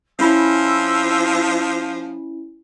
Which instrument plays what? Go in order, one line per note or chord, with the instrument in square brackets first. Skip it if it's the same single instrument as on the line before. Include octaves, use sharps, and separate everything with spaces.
[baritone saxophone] F3 [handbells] C#4 E4 [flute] E6